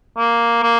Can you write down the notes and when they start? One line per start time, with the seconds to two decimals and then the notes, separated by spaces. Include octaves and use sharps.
0.18 A#3
0.63 A#3